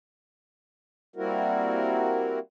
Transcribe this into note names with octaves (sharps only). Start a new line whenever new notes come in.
G3 A#3 C4 E4 F#4 A#4